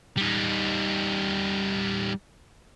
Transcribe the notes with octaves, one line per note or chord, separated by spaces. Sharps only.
G3 D#4